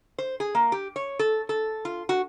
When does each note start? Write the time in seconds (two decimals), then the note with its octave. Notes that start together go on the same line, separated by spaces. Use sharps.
0.18 C5
0.40 G#4
0.55 A#3
0.72 G4
0.96 C#5
1.19 A4
1.49 A4
1.85 F4
2.09 F#4